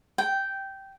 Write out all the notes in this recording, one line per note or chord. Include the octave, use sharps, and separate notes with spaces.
G5